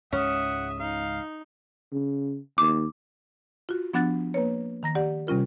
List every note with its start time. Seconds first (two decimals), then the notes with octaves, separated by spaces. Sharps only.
0.12 C#2 G#2 C#3 C#4 E5 F#5 D#6
0.80 D#4 F5
1.92 C#3
2.58 D#2 D6
3.69 F4 F#4
3.94 F3 B3 D4 F#5 F#6 A6
4.34 A#3 B4 C#5
4.83 D#3 A#5 A#6
4.95 G4 D5 F#5
5.27 C3 G3 C#4 F4 A#4